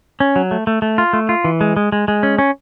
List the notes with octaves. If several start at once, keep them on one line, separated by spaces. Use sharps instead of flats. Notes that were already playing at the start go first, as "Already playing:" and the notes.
C#4
F#3
A3
A3
A3
F4
A3
F4
E3
G#3
G#3
G#3
G#3
C#4
C#4